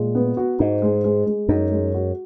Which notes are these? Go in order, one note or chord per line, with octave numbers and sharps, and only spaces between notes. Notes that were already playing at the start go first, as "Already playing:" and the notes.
Already playing: A#2 G#3
B3
F#4
G#2 D#4
G#3
G#3
G#3
F#2 D#4
G#3
F#4